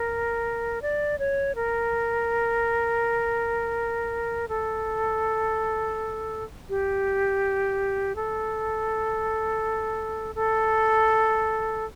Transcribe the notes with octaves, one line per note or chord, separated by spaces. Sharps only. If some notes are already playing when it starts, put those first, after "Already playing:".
Already playing: A#4
D5
C#5
A#4
A4
G4
A4
A4